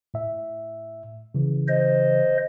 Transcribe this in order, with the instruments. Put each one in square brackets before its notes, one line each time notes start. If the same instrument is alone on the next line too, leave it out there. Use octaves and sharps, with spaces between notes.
[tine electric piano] A2 E5
C#3 E3
[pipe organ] C5 D#5